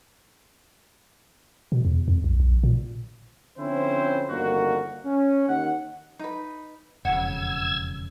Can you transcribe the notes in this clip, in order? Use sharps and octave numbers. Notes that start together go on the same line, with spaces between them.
B2
E2
F2
B1
A#1
A#2
D3 F3 C4 C#4 E4 C5
G1 F2 D#3 A#3 F#4
C#4
D#2 F#5
D#4 B4
E1 F2 C#3 F#5 E6 G#6